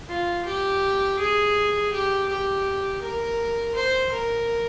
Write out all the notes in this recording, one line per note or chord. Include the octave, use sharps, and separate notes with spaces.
F4
G4
G#4
G4
G4
A#4
C5
A#4